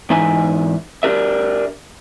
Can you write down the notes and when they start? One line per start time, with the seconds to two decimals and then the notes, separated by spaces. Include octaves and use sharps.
0.10 G#2 E3 D#4 E5 G#5
1.03 D4 G4 A#4 E5